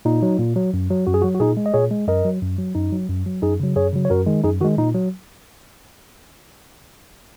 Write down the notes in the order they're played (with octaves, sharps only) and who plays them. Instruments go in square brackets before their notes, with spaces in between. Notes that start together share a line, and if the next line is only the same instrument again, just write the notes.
[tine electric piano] A#2 D#4
F#3
A#2
F#3
F#2
F#3
F#2 F#4
G#4
F#3 F#4
F#4
A#2 D#4 G#4
G#3
D#5
A#2 G#4 C#5
G#3
F#2 A#4 D#5
F#3
F#2
F#3
F#2 D#4
F#3
F#2
F#3
F#2 D#4 G#4
C#3 F#3
F#2 G#4 C#5
C#3 F#3
C#5
F#2 F#4 A#4
D#3 G#3
F#2 D#4 G#4
D#3 F#4
G#3
A#2 D#4
F#3